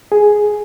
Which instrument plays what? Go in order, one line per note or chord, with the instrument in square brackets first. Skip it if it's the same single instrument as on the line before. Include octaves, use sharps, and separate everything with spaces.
[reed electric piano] G#4